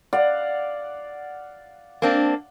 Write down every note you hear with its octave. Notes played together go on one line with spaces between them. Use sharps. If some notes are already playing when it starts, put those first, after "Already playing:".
D5 F5 F#5
A#3 C4 D4